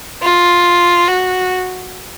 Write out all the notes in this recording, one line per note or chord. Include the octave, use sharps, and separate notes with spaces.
F4
F#4